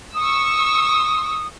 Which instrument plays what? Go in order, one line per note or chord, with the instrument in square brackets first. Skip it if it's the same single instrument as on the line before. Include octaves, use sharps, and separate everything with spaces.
[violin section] C#6 E6 [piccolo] D#6